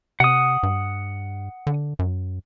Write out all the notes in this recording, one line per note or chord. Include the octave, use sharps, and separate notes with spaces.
C3 F#5 D#6
G2
D3
F#2